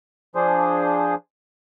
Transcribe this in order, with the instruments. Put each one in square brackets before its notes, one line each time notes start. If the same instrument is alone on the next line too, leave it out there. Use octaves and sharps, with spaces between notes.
[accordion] F3 D4 G#4 C5